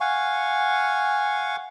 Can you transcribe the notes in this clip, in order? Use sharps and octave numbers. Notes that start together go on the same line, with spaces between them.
F5 F#5 G#5 C#6